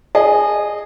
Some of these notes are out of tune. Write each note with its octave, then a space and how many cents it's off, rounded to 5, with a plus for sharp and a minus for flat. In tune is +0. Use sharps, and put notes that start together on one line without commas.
G#4 +0 D#5 -25